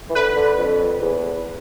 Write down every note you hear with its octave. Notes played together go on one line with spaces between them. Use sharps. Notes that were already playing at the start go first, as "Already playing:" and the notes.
E3
D3 B4
D3
F2
E2